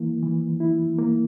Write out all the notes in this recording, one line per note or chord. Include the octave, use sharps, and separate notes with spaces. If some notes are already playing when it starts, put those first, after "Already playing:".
Already playing: E3 A#3 E4
E3
E4
A#3